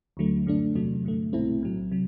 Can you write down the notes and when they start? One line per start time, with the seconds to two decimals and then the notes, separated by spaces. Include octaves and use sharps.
0.17 D2 D3 F#3 A3
0.46 F#2 D3 A3 D4
0.75 E2 C3 F#3 A3
1.05 G2 D3 A3
1.33 C2 B2 A3 C4 E4
1.61 B1 A2 F#3
1.91 C3 F#3